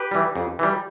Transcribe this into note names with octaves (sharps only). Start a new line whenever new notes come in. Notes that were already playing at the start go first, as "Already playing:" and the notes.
Already playing: G4 B4
E3 G3
F2
E3 G3